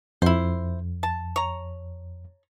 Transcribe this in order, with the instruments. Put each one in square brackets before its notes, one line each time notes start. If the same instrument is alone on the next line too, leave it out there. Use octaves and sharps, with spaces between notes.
[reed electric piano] F2 [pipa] E4 C5
[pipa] A5
C#5 A#5